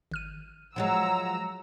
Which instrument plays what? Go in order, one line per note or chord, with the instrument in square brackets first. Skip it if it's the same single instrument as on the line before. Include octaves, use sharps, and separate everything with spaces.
[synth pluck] G#1 F6 D#7
[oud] F3 F#3 G#3 [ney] F#5 [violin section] A#5 E6